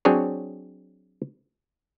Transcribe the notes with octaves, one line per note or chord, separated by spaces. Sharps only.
F#3 C4 D4 G#4 C#5